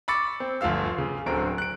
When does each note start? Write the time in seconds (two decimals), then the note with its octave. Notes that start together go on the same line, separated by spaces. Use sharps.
0.08 B5 C#6 D6 E6 A6 C#7
0.40 C4
0.61 G1 D2 F3 F5 E6
0.98 C#3
1.26 D1 D3 C4 A#5 D7
1.58 F#6 D7